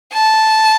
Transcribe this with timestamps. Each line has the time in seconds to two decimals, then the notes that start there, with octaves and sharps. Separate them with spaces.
0.13 A5